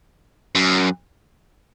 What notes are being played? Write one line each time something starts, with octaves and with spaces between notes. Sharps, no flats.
F#2